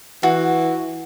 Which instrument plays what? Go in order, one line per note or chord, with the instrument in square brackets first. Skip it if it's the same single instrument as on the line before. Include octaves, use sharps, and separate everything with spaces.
[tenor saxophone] E3 [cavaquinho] F#4